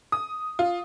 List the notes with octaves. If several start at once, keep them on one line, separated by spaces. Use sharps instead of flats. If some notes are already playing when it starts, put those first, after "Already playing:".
D#6
F4